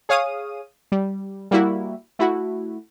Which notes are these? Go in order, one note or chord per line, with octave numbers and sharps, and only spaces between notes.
G#4 C#5 F5 D#6 D#7
G3
G3 A#3 E4 F#4
A3 E4 F#4